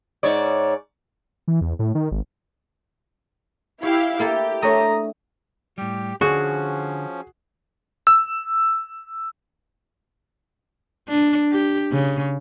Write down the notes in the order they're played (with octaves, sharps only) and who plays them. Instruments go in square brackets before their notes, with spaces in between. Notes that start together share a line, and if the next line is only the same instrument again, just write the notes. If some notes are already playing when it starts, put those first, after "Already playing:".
[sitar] G#2 C#5 D5
[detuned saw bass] E3
E2
A2
D#3
G#1
[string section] E4 G4 F5 [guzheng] C#5
[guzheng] A#3 E4 A4 [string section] G4
[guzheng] A3 D4 [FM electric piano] A4 C#5 D#6 [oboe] A#5
[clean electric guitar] A2 G3 [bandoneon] G4
[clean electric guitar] D3 [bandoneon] F3 C#4 [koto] F#4 [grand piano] G#4
[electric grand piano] E6
[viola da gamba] D4
G4
C#3